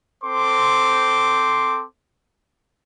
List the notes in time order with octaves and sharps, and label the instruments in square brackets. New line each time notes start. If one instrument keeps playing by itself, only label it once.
[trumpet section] C4 A4 C5 C6 D6